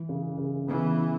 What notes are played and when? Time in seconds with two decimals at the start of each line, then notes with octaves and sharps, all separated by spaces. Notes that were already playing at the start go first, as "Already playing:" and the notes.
Already playing: E3
0.09 C#3
0.38 C#3
0.67 E3 B3